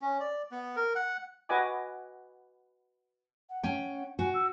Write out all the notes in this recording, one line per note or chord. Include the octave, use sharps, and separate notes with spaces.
C#4
D5
B3
A#4
F#5
F#4 B4 D#5 F#5 G#5 D6
F#5
C#4 G5
F#4 G#5
E6